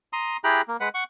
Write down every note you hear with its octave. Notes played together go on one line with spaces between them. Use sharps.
A#5 C6 D#6
E4 G4 G#4 G5 A#5 F#6
A#3
G#3 B4 F#5
F#5 C#6